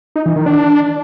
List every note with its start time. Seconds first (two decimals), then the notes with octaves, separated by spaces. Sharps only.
0.16 D#4
0.26 E3
0.36 D#3
0.46 D4